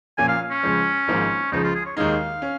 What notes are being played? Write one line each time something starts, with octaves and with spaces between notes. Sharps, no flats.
A#2 F3 A#3 C#4 F4 G#5
F5
C#4
C#2 C#3 F3 G#3
G#1 G#2 F3 A#3 F4
C#2 C#3 F3 D#4
F4
G#4
C#5
D#2 D#3 G#3 D#4 F5
C#4